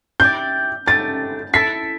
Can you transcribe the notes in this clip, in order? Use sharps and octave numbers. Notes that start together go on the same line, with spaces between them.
E4 G4 D5 G6
A3 D4 G4 A6
E4 A4 E5 A5 B6